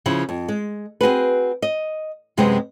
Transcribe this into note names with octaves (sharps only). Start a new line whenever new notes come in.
C#3 F3 E4
F2
G#3
C4 F#4 G#4 B4
D#5
F#2 C3 G#3 B3 C4